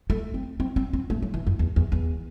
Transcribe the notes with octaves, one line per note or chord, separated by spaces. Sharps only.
A3
C4
C4
C4
C4
A3
F#3
E3
F#2
E2
E2
E2